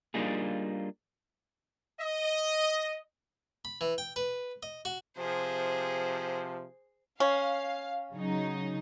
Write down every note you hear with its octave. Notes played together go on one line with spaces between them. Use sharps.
G3 A#3 D4 D#4 F4 G#4
D#5
B5
E3
G5
B4
D#5
F#4
C3 F3 G#4 C5
C#4 F5
C#3 F#3 D#4